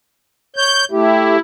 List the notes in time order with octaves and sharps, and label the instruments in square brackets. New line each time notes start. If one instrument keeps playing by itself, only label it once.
[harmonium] C#5 [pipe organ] G6
[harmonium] A3 G4 [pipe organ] E4